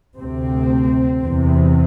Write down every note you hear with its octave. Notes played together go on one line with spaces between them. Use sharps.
D2 C3 C4
E2 C3